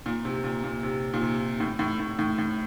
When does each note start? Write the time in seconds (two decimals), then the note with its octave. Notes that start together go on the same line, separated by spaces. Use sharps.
0.06 A#2
0.25 C3
0.44 A#2
0.64 A#2
0.83 C3
1.14 A#2
1.22 C3
1.60 A2
1.79 A2
2.00 A2
2.19 A2
2.38 A2